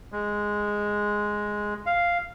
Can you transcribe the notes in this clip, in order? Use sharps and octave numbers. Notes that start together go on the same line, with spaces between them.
G#3
F5